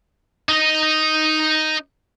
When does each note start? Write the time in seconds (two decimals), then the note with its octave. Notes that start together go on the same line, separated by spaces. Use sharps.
0.49 D#4 D#5